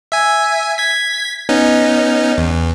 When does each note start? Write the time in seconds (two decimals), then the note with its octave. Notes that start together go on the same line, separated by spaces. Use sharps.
0.12 E5 G#5
0.78 G#6 B6
1.49 B3 C#4 D#4
2.38 E2